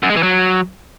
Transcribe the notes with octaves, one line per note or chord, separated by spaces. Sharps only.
F#2
G#3
E3
F#3